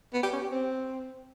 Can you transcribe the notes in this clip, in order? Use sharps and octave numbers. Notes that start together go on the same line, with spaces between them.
B3
G4
C#4
G4
C4